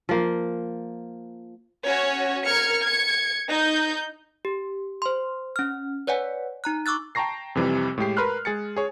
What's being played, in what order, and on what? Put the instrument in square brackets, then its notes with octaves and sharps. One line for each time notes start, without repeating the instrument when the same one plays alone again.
[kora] F3 A#3
[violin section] C#4 F#4 C#5
A#4 F6 G#6 C#7
G#6 C#7
D#4 G6
[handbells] G4
C5 C6
C#4 F6
B4 C#5 D5 F#5 G#5
D#4 A#5 F#6
C#6 D6 E6 F#6 A6
[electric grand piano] G5 A5 A#5 C#6 A#6 C7
F2 C3 E3 G3
A2 G#3 G4 C7
A#4 B4 B5 C6 F6 F#6
G#3 G#4 A6 C#7
G#4 C#5